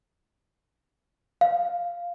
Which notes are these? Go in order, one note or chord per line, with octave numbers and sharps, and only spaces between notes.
F5